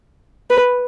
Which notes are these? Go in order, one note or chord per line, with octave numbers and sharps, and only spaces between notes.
B4